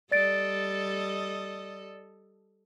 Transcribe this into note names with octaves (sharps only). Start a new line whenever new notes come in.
G3 A4 D5 D#5 A6 D7